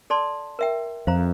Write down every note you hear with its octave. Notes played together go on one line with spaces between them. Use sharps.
A4 D5 A5 C6
A#4 E5 G5
F2 C5 F5 A#5